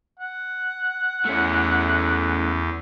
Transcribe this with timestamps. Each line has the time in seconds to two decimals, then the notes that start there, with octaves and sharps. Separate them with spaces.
0.19 F#5
1.25 E2 A3 C#4